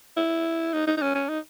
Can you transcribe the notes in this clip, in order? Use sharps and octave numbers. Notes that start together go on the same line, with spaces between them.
E4
D#4
D#4
D#4
C#4
C#4
D#4